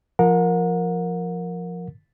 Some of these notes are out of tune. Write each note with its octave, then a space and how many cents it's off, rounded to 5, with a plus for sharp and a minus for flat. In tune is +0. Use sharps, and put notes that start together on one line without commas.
F3 +0 A#4 +0 F#5 -35